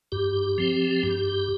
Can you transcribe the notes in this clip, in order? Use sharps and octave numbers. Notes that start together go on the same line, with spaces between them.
G2 G4
F3 C4
G2